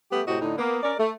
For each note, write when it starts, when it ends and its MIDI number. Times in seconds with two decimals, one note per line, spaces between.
0.12 0.21 55
0.12 0.21 57
0.12 0.21 59
0.12 0.21 67
0.27 0.38 45
0.27 0.38 48
0.27 0.38 66
0.27 0.38 67
0.27 0.38 75
0.41 0.54 45
0.41 0.54 50
0.41 0.54 63
0.58 0.78 58
0.58 0.78 59
0.83 0.94 61
0.83 0.94 70
0.83 0.94 74
0.99 1.12 57